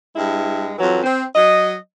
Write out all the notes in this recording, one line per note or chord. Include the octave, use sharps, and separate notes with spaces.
G2 G#3 E4
F2 E3 F#3
C4
F#3 D#5